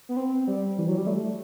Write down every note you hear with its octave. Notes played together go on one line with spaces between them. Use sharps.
B3
C4
G3
E3
F#3
G3
A3